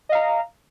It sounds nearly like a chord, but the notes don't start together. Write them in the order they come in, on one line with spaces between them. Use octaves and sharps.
D#5 F5 A#5